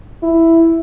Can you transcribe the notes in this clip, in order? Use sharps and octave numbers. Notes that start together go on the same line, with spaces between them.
E4